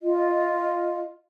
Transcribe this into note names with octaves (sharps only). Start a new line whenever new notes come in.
F4 D#5